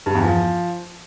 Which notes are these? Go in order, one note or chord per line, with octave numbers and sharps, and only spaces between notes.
G2
E2
F3